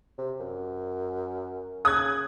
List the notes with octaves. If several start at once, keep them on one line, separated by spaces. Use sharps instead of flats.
C3
F#2
C#3 D#6 F#6 G#6